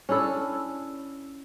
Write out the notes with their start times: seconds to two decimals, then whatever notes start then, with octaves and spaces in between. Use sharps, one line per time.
0.09 C#4 D4 E4 A4